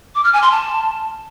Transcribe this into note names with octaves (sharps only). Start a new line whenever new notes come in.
D6
F6
G#5
C6
A5